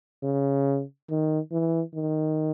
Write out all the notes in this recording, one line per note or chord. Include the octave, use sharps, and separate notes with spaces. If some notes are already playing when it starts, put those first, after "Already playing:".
C#3
D#3
E3
D#3